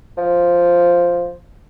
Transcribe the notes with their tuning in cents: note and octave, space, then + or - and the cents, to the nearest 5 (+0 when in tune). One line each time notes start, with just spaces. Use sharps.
F3 +0